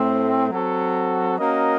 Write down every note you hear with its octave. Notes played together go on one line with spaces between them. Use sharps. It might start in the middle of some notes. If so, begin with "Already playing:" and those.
Already playing: A2 A3 C4
F#3 C4 F#4 A4
A#3 C#4 F#4 A#4 D#5